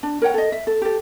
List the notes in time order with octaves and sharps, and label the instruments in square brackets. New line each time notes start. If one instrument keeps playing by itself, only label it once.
[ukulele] D4
A#4 C#5 F#5 G5
A4 D#5
E5
A4
G4 A4